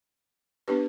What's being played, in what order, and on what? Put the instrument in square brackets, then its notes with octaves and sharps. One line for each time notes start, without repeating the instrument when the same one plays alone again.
[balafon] B3 D4 G4 B4